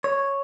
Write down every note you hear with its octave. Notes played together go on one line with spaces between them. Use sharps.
C#5